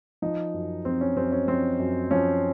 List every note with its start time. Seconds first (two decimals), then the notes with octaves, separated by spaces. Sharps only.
0.22 F3 D#4
0.54 F#2
0.85 F3 C4
1.01 C#4
1.16 F#2 C4
1.32 C#4
1.48 F3 C4
1.79 F#2
2.11 F3 C#4